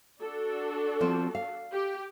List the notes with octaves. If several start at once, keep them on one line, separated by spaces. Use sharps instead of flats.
D4 F#4 A4
F3 C4
F5
G4